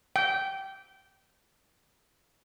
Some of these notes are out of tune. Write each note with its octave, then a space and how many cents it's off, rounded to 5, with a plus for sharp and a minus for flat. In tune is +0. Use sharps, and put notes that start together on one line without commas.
G5 -15